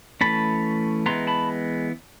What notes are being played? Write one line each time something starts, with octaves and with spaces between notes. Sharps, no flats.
E3 A3 C#4 A5 B5
E3 G#3 B3 A#5 C6
A5 B5